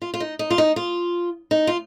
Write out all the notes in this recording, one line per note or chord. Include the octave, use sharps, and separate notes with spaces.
F4
F4
D#4
D#4
F4
D#4
F4
D#4
F4